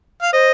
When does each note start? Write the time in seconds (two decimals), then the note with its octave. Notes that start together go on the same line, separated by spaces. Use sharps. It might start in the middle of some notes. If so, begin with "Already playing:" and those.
0.22 F5
0.33 C5 D#5